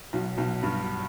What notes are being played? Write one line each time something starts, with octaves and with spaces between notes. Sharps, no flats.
B1 B2
B1 B2
G2